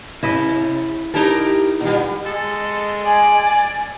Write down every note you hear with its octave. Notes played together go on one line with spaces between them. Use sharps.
C3 E4 D#5 E5
D#4 E4 G4 A4 A#4
A#2 G3
G#3 A4
D5 G#5